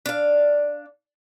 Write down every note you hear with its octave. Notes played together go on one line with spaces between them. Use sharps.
D4 F5